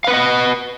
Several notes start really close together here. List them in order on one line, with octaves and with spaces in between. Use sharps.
F5 B4 F#5 D#5